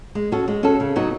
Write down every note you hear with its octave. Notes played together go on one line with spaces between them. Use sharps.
G#3
C#4 F#4 A4
G#3
C#4 F#4 A4
C#3
F#3 B3 D#4 F#4